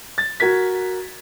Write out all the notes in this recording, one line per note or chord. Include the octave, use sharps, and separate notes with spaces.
A6
F#4 A#4 G#6 B6